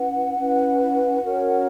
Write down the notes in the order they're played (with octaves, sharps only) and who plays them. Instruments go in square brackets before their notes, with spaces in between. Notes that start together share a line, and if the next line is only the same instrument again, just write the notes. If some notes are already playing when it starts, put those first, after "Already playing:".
Already playing: [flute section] C#4 E4 B4 F#5
C#4 E4 B4
C#4 F#4 A#4 C#5